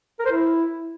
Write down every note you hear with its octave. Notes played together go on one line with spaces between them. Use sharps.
A#4
C5
E4